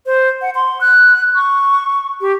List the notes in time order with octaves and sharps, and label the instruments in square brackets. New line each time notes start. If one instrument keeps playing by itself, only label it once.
[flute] C5
F#5
C6
F#6
C#6
G4